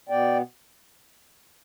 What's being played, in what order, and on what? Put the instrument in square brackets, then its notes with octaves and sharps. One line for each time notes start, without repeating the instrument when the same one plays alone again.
[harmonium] B2 B3 D5 G5